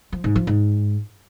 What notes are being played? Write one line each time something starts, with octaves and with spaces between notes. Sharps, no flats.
F3
G#2
F3
G#2